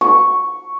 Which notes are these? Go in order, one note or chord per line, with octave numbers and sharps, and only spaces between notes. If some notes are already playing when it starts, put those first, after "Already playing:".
C#6